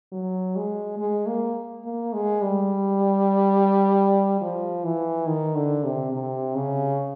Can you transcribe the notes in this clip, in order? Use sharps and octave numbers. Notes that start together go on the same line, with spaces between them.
F#3
G#3
G#3
A#3
A#3
G#3
G3
F3
E3
D#3
D3
C3
C3
C#3